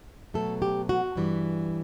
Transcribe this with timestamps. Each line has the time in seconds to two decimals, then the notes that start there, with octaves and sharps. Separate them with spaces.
0.34 B2 F#3 A3 A4
0.62 G4
0.89 F#4
1.16 G2 E3 G3